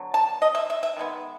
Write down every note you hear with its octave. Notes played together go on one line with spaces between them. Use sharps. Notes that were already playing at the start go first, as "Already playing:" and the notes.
Already playing: D3 F#3 B3
A5
D#5
E5
E5
E5
D#3 G#3 B3